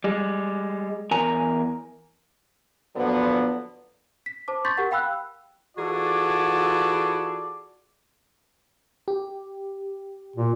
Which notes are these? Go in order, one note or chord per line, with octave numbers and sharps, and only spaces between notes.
G3 G#3
E2 A#4 G#5 A#5
A#2 D3 F3 F#3 B3
B6
C5 A5 D6
C6 C#6 G6 A6 B6
G4 A#4 F#5
F5 G5 B5 E6 F#6
E3 F4 F#4 G#4 A4 D5
G4
A#2